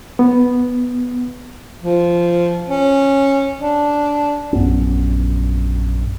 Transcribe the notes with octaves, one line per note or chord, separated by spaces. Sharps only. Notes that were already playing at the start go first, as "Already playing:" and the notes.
B3
F3
C#4
D4
A#1 F#2 B3 C#4